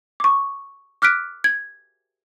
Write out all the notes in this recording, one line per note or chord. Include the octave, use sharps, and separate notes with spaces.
C#6 D6
D6 F6 F#6 B6 D7
G#6